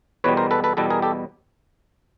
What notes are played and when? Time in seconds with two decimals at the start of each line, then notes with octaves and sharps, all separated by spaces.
0.24 E2 B2 G3 B4 C#5
0.37 A#4 C5
0.51 A4 B4
0.64 A4 B4
0.77 E2 B2 G3 A4 B4
0.90 G#4 A#4
1.02 G4 A4